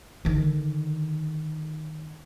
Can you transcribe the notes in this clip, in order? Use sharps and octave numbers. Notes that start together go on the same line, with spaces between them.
D3 D#3